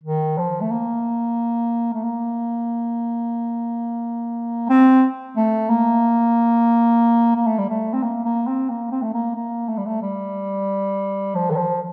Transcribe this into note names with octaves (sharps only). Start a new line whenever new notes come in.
D#3
F3
A3
A#3
A3
A#3
C4
A3
A#3
A#3
A3
G3
A3
C4
A#3
A#3
C4
A#3
C4
A3
A#3
A#3
A3
G3
A3
G3
F3
D#3
F3